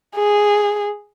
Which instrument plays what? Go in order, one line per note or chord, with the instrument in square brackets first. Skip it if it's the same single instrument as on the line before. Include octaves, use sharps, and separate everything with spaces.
[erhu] G#4